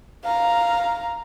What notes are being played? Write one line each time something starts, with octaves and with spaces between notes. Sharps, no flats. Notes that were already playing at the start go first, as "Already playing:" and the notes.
F5 A#5